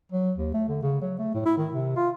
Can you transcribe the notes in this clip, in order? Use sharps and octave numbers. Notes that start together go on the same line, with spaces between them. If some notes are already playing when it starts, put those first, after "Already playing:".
F#3
D#2
A3
D3
C#3
F#3
A3
A2
E4
D#3
C3
F4